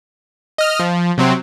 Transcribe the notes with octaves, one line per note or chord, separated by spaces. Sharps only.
D#5 F6
F3
C3 F#3 C4